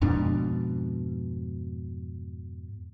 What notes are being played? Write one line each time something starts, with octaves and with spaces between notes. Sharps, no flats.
F2 G#2 B2 D4